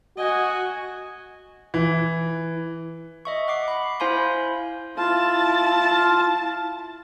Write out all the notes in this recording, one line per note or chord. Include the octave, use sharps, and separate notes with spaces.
F#4 D#5 G#5
E3
D#5 E5 C#6
F#5 D6 C7
B5
E4 C5 F5 G#5 B5 C6
E4 F4 A5